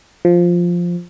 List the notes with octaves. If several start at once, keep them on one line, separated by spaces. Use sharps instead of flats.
F3